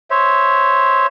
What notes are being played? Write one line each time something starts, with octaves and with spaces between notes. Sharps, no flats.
C5 C#5 E5